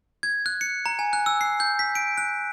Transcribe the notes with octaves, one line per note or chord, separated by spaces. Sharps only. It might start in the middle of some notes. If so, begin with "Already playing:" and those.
G#6
F#6
C#7
A#5
G#5
F#6
E6
C7
G6
B6
D7
F#6